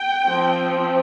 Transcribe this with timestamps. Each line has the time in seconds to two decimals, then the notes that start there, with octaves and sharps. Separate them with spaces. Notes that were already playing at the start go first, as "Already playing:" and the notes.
Already playing: G5
0.24 F3 C4